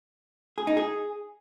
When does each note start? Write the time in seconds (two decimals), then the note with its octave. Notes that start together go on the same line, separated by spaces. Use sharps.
0.58 G#4
0.67 D#4
0.77 G#4